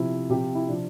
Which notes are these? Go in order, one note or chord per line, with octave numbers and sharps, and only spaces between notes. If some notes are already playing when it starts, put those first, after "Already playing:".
Already playing: C3 F3 E4
C3 F3 G4
F4
E4
C3 F3 D4